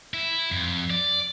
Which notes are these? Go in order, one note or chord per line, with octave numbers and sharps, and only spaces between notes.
E4
F2
D5